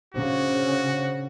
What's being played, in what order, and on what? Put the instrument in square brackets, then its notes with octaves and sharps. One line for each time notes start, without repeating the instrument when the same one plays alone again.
[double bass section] C#3 [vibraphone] D4 C5 [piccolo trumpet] F#4